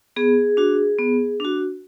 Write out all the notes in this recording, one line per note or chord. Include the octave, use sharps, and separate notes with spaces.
B3 G#4
D4 F#4
B3
D4 F#4